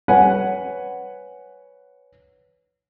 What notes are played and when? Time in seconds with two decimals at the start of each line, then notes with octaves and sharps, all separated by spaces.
0.08 B4 C#5 F#5 G#5